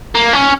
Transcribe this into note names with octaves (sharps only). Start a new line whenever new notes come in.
A#3
C#4